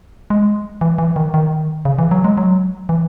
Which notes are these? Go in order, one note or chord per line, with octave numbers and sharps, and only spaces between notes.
G#3
E3
E3
D#3
D#3
C#3
E3
F#3
G#3
F#3
E3